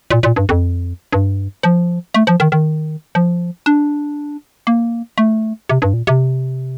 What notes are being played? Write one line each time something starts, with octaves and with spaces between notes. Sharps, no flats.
A#2
A#2
G2
F2
G2
F3
A3
F3
D#3
D#3
F3
D4
A#3
A3
C3
G2
A#2
C3